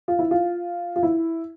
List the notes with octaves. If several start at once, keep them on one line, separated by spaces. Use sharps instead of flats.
F4
E4
F4
F4
E4